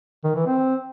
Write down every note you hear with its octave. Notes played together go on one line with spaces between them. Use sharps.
D#3
E3
C4